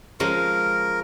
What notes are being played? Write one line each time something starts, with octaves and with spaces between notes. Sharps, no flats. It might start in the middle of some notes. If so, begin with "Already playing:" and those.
F3 G#3 C#4 A#4